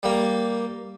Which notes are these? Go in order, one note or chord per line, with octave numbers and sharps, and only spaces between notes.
G3 A#3